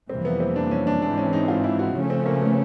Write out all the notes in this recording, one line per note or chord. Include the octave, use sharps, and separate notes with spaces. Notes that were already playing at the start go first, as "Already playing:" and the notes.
F2 C3 E3 G3 A#3 C4
B3
C4
D4
C#4
D4
G#2 E3 G#3 C4 D4
C#4
D#4
F4
E4
F#4
C#3 F3 A3 C#4
C4
A#3
B3